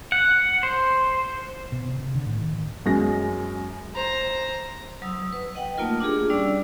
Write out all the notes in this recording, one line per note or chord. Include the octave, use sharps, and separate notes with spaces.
F#5
C5
B2
C3
C3
D3
A2
D#3
F#2 G#3 A#6
C5 A#5
F#3 D#6 E6
B4
D#5 F#5 G5
A3 A#3 D#4 F4 A#4
D4 F4 G4 G#4
G3 C#4 D4 D5 D6 E6